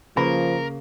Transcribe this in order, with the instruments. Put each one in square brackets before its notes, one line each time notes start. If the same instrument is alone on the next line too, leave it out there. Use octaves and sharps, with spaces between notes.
[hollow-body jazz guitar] C#3 A#3 [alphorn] F3 [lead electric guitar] A#4 [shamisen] B4